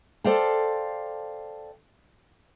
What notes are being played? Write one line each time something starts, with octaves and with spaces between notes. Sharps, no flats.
A4 C5 D5 F5 G5 A5